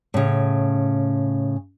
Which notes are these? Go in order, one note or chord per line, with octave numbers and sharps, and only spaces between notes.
A2 C#3